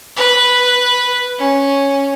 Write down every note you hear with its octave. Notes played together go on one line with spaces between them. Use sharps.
B4
C#4